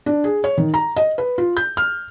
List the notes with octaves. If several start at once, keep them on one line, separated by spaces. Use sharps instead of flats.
D4
G#4
C#5
D#3
A#5
D#5
B4
F4
G6
F6